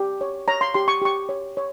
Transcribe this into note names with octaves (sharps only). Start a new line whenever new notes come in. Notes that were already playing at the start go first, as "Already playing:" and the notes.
Already playing: G4
C#5
C#5 A#5
C6
G4 C6
C#6
G4 C#6
C#5
C#5